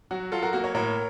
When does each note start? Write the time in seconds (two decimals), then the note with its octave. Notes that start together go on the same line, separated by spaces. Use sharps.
0.11 F#3 F#4
0.32 F#3 F4 A4
0.43 F#4 A#4
0.53 A#3 F#4 A#4
0.64 A#4 C#5
0.75 A2 A#4 C#5